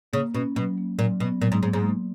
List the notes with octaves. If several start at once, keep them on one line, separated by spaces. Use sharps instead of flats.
C#3 A#3
B2 C#4
B2 F#3
A#3
A#2 F#3
B2 B3
A#2 F#3
G#2
G#2 A#3
G#2
A#3